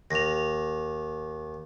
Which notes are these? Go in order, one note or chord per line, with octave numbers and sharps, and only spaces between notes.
D#2 A#6 F7